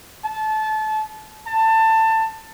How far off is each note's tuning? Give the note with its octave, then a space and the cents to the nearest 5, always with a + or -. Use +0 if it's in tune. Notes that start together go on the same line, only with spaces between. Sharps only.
A5 -25
A5 +20